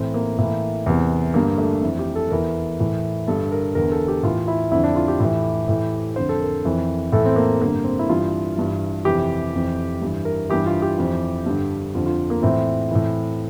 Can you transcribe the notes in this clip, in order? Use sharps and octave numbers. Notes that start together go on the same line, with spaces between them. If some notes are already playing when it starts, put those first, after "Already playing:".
Already playing: A2 E3 C4
A#3
A2 E3 A#3
E2 C3 E3
G2 D3 A#3
A3
F2 E3
G4
A4
E2 E3 A#4
A2 E3
G2 D3 A4
A#4
E2 D3 A#4
A4
G4
A2 E3 F4
E4
F2 D3 E4
D4
F4
G4
A2 E3
A2 E3
F2 D3 C5
A4
A#4
F2 E3
A2 E3 A4
C4
A#3
G2 D3 A#3
C4
E4
G2 E3 F4
G2 E3
F2 C3 E3 G4
F2 E3
G2 E3
A#4
G2 E3 G4
F4
G4
F2 E3
G2 D3
F2 D3 F4
F4
A#3
A2 E3 C4
A2 E3